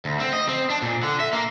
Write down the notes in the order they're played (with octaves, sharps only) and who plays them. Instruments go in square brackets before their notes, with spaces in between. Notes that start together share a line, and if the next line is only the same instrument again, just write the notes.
[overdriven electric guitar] D2
C4
D#5
C4
D4
A#2
D3
E5
A#3